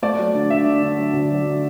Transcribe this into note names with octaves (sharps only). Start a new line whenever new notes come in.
A3 D5
F#3
D3
D3 E5
D3
D3
F#3
D2
F#3
D3